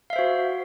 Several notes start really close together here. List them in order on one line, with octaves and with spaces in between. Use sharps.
F5 E5 C5 F#4